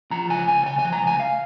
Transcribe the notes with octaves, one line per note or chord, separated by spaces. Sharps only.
F3 A#5
C#2 G#5
C#2 G#5
C#3 G#5
G#5
F3
A#5
C#2
G#5
F5